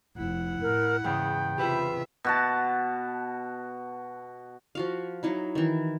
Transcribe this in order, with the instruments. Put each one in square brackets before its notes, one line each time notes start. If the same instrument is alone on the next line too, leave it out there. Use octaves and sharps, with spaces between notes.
[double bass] F1 [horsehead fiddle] E4 F#5
[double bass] A2 [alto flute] A#4
[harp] E2 C#3 [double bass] G#2 [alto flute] G5
[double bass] C3 [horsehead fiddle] F4 E5 [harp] G4 B4 F#5
[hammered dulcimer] B2 F#4 A5
[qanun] F3 F#4 F5
F#3 D#4 E4
D#3 E3